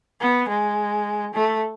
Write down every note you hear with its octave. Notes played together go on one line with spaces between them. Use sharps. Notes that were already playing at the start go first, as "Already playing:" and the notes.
B3
G#3
A3